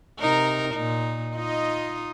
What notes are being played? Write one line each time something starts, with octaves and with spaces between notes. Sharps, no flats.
C3 D#4 A#4
A#2 D#4
D#4 F4 D#5